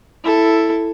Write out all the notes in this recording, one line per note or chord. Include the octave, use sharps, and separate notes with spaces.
E4 A4